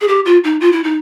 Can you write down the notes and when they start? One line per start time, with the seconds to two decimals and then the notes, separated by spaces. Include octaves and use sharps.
0.01 G#4
0.08 G4
0.25 F4
0.44 D#4
0.60 F4
0.72 E4
0.84 D#4